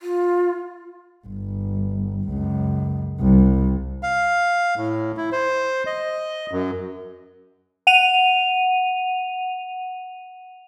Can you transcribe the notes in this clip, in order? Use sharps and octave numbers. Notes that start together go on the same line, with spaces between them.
F4
G1
C#2 F#2
C2 G3
F5
A2
E4
C5
D#5
F#2
F#5 D#7 F7